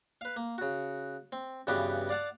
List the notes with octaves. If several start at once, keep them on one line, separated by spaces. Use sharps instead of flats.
B4 F5
A#3
C#3 F#4
C4
G2 C#3 E3 B3 F#4 G4
D5 F5 F#5 A5